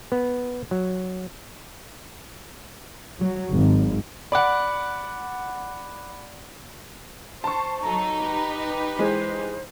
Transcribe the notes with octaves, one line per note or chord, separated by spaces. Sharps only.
B3
F#3
F#3
G#1
D5 F#5 B5 D6 F#6
C5 A5 C#6
F#3 D#4 A4 A#5
G4 B4
E3 G#3 C5